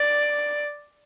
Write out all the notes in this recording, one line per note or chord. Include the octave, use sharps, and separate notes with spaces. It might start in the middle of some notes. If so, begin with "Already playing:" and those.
Already playing: D5